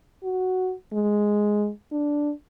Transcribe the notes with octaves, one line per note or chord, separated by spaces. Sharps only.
F#4
G#3
D4